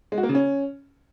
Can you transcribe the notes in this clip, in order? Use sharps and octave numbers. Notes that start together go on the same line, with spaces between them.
G#3
F#4
A#3
C#3
C#4